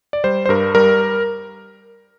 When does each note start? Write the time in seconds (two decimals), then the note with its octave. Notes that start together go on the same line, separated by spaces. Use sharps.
0.13 D5
0.24 G3 C5
0.46 C5
0.49 G2 A#4
0.75 G3 A#4